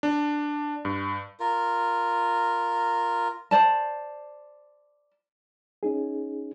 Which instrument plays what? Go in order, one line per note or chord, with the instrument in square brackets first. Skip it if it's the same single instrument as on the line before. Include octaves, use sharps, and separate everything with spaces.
[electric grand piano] D4
G2
[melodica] F4 A#4
[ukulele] C5 D5 A5
[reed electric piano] C#4 D#4 G#4